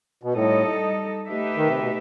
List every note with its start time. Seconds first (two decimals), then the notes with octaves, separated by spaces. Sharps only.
0.23 B2
0.34 A2 G3 D#4 A4 D#5
1.28 A3 D#4 G4 B4 E5
1.57 D#3
1.69 C3
1.80 B2